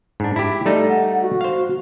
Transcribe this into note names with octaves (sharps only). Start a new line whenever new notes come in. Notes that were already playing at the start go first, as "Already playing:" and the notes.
G#2 D4
E4 G4
G3 A3 D#4 D5
F#5
F#4
C5 F5